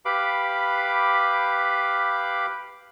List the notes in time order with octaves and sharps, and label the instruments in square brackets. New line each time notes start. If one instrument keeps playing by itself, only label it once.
[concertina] G4 B4 F5 B5 D6